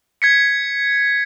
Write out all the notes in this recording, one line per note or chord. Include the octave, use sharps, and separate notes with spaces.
G#6 B6 C#7